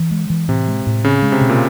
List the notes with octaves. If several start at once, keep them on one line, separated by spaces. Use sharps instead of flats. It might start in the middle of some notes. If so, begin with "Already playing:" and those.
Already playing: E3
G#3
E3
A2 C3
G#3
A2
C#3 C4
G#3
C3
B2
A#2